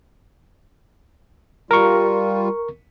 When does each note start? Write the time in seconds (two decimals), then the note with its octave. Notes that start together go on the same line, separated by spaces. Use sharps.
1.71 G3 F4 A#4 C#6